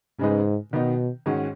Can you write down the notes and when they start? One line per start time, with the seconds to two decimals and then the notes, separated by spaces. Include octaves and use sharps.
0.19 G#2 C#3 G#3 D#4 B4
0.73 B2 D#3 B3 D#4
1.26 G#2 D#3 G#3 C#4 F#4